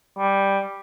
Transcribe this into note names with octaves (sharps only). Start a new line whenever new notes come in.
G3